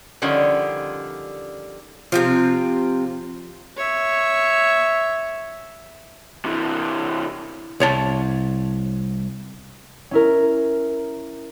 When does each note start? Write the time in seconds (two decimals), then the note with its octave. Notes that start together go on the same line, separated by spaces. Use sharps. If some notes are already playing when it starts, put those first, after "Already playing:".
0.22 D3 D#3 F3 G3 C#4
2.12 C3 F3 C4 F4
3.77 C#5 E5
6.45 C3 E3
7.80 C2 C#5 A5
10.11 C#4 E4 A#4